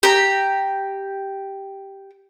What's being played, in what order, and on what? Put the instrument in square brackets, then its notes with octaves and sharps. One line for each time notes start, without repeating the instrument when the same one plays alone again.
[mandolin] G4 A#5